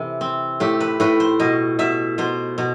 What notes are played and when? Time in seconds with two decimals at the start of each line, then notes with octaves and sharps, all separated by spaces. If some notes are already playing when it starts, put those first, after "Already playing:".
Already playing: C3 E3 A4
0.21 C4
0.60 A2 G4
0.80 B4
1.00 A2 B4
1.20 C5
1.40 B2 D#5
1.79 B2 E5
2.18 B2 C5
2.58 B2